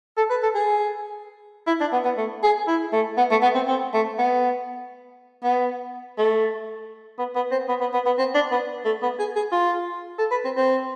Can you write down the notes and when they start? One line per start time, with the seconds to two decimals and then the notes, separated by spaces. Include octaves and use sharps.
0.17 A4
0.30 B4
0.43 A4
0.55 G#4
1.67 E4
1.80 D4
1.92 B3
2.05 B3
2.17 A3
2.43 G#4
2.67 E4
2.93 A3
3.17 B3
3.30 A3
3.42 B3
3.55 C4
3.67 C4
3.93 A3
4.18 B3
5.43 B3
6.18 A3
7.18 B3
7.35 B3
7.51 C4
7.69 B3
7.80 B3
7.93 B3
8.06 B3
8.18 C4
8.35 D4
8.52 B3
8.85 A3
9.02 B3
9.19 G#4
9.36 G#4
9.52 F4
10.18 A4
10.31 B4
10.44 C4
10.57 C4